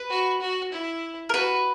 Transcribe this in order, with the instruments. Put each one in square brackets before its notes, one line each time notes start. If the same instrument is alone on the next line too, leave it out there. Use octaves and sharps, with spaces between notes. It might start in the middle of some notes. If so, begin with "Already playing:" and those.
Already playing: [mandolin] B4
[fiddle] F#4
F#4
E4
[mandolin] A#4
[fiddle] F#4 [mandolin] B4